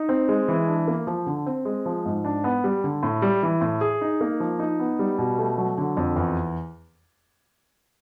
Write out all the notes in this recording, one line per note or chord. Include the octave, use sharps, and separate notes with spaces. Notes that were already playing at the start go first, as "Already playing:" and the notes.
Already playing: D#4
C4
G#3
E3
D4
A#3
F3
D3
C4
G#3
F3
G#2
D4
B3
G3
D3
A2
G3
E3
A2
G#4
D#4
A#3
F3
D#4
B3
G3
B2
A3
F#3
D3
F2
E2